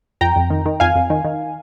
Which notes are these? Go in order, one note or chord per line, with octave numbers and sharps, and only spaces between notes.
F2 G5 A#5
F2
D#3
D#3
F2 F5 G#5
F2
D#3
D#3